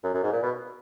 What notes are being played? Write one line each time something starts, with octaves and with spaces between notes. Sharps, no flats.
F#2
F#2
G#2
A#2
B2